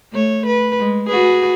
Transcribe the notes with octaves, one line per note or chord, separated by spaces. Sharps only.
A3 C#5
B4
G#3
F#4 G#4 B4